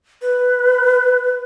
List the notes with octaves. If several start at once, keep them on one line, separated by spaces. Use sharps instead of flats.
B4